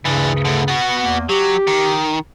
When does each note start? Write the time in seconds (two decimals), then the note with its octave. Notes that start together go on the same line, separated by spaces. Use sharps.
0.05 D2 G2 C#3 E3 D4
0.45 A2 D3
0.68 B3 F#4
1.03 E2 A#3
1.29 F#3 G4
1.67 D#3